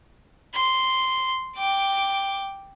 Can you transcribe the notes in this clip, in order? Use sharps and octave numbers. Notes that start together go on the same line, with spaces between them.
C6
G5 D6